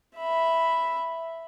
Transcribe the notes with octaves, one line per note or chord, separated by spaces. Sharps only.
E5 B5